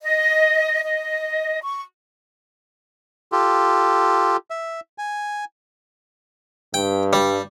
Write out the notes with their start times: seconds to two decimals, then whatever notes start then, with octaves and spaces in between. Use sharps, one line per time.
0.02 D#5
0.83 D#5
1.62 C#6
3.32 F4 G4 A4
4.50 E5
4.98 G#5
6.74 G2 G5
7.13 G3